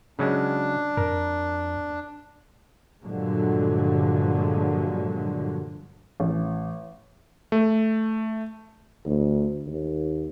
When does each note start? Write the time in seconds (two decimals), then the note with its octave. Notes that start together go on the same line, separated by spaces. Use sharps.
0.19 C#3 F#3 G#3 D4
0.97 F2 A#4
3.03 G2 A#2 D3 F3 F#3 G#3
6.20 A1
7.52 A3
9.06 D2
9.66 D#2